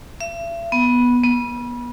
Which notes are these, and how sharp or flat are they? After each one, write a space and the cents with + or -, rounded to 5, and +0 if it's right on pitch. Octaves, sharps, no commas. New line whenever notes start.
E5 +40
B3 -10
B3 -30